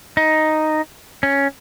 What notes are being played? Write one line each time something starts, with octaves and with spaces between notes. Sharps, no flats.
D#4
C#4